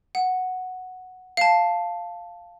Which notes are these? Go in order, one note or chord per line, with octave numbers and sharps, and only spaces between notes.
F#5
F5 A5